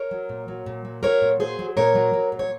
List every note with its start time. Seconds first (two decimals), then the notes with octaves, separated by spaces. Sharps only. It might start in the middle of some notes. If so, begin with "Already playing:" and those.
Already playing: A#4 C#5
0.11 F#3
0.29 A#2
0.48 F#3
0.66 A#2
0.85 F#3
1.03 F#3 A#4 C#5
1.22 A#2
1.40 F#3 G#4 C5
1.59 F#3
1.77 A#2 A#4 C#5
1.95 F#3
2.14 F#3
2.32 A#2
2.39 C#5